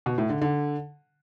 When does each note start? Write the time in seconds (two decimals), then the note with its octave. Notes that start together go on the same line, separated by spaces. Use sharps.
0.06 B2
0.18 A2
0.30 D3
0.41 D3